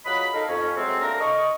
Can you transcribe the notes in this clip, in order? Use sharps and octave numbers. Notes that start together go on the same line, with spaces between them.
C#3 F#3 F4 D#5 B5
D#4 A4 A#4 F5
F2 C#4
C3 F#3 G#3 A3 C4
A#3 D4 E4 A4 A#4
D#5 C#6